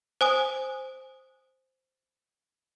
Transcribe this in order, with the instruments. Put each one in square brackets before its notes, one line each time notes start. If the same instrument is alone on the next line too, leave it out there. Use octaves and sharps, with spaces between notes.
[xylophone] C5 G#5 D#6